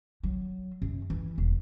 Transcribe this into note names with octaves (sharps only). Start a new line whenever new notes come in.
F#3
F#2
E3
E1